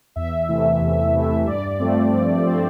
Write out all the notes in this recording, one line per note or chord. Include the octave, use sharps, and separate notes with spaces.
E2 E5
C3 E3 A3
E2
C3 E3 A3
G2 D5
F3 A3 C4
G2
F3 A3 C4